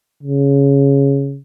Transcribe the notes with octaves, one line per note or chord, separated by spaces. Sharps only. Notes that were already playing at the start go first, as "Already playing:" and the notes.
C#3